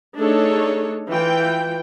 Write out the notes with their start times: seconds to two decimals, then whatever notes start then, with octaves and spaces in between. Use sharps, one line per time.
0.17 A3 D4 D#4 G#4 A4 C#5
1.10 E3 F4 G5